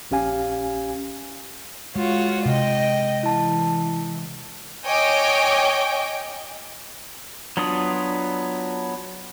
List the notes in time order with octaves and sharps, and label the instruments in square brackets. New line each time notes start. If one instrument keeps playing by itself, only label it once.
[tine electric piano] A#1 C#4 G4 F5 G#5
[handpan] G#3 [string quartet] F4 F#4 C#5
[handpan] C3 [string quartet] D#5 G5
[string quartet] E3 [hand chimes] E4 A5
[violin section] C#5 D#5 G5 G#5 D6
[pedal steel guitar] F#3 B3 D4 F4 D#6